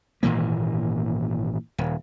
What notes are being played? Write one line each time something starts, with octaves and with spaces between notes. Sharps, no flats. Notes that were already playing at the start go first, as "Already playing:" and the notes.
G#1 A#2 E3 A#3
D#1